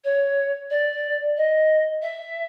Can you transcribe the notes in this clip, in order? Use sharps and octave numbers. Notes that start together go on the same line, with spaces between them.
C#5
D5
D#5
E5